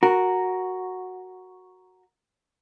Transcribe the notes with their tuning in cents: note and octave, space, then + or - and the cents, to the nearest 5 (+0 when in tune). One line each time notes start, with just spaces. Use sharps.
F#4 +0 A#4 +0